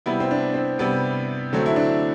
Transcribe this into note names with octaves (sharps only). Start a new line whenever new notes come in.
C3 G3 B3 E4
C4
D4
C4
C3 G3 B3
D3 F#3 A3 C4
E4
D4